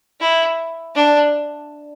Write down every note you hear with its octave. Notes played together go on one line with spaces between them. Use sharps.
E4
D4